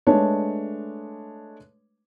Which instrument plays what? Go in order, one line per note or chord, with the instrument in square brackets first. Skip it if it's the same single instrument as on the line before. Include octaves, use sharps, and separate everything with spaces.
[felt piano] G#3 A3 D4 B4 C#5